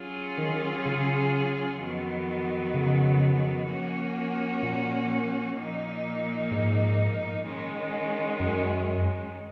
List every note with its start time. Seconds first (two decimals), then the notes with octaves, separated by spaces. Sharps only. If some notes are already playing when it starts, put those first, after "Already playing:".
Already playing: F#3 C#4 F4 G#4
0.38 D#3
0.85 C#3
1.80 F2 D#3 F#3 B3
2.74 C#3
3.68 F3 A#3 C#4 F#4
4.63 A#2
5.57 A#2 F3 A#3 D#4
6.51 G#2
7.46 D#3 G#3 C#4
8.40 F#2